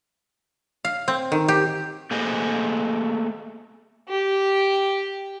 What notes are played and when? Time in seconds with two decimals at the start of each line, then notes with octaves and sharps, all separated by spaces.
0.85 F5
1.08 C4
1.32 D#3
1.48 G4
2.11 A3 A#3 G4 G#4 C5 D#5
4.09 G4